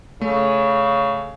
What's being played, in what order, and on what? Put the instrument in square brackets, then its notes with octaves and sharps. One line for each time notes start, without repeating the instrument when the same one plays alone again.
[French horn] C#3 [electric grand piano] A3